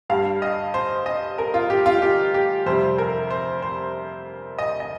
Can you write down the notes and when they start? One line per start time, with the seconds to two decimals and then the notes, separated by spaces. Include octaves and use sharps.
0.10 G2 G3 F5
0.42 D#5
0.74 C5
1.06 D#5
1.38 A#4
1.54 F4
1.70 G4
1.86 F4
2.02 G4
2.34 G4
2.66 F2 C3 G3 C5
2.98 A#4
3.30 C5
3.62 C5
4.58 D#5
4.80 D#5